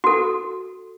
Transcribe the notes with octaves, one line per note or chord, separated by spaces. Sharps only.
F#4 A4